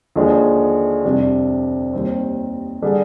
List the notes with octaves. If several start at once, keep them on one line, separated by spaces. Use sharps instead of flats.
D#2 D3 F3 G#3 D4
F2 C3 G3 D4
D#2 D#3 G3 C4
D3 G3 D4 G#4